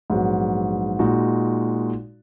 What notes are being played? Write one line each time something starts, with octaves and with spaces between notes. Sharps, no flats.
A#1 G#2 F#3 B3 F#4
A#2 G#3 D#4 F#4